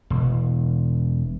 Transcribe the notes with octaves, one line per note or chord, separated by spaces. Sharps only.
E1